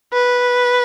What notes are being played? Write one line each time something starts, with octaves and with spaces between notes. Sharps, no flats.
B4